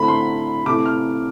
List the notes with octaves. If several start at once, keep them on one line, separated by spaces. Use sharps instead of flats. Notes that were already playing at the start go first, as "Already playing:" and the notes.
Already playing: D2 D3 A3 C4 E4 B5
C6
C3 E3 A3 D6
F6